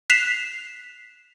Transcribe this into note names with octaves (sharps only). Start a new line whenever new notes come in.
F#6 B6 C7 E7 F7